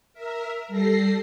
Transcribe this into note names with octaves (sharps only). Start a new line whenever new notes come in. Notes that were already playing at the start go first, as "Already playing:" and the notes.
A#4 E5
G3 A4 A#6 C7